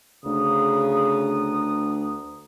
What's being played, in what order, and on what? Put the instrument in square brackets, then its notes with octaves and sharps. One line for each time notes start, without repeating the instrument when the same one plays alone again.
[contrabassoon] D2 [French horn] C#3 [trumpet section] B3 A#5 D#6